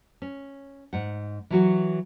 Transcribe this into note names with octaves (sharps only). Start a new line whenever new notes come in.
C#4
G#2 F#5
E3 F#3 F#4